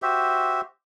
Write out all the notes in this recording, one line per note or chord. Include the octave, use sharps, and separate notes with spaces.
F#4 G4 C5 E5